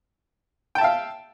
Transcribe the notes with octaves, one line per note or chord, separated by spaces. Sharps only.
E5 F5 G5 A5